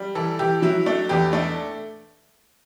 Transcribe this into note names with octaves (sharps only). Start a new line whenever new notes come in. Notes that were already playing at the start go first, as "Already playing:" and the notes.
Already playing: G3
E3 A4
E3 G4
F#3 E4
A3 D4
E2 G4
A3 D4